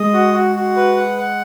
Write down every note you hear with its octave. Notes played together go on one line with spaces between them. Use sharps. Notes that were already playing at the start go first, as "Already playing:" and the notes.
Already playing: G#3 D#5
F#4
F#4
F#4
B4
F#5
F#5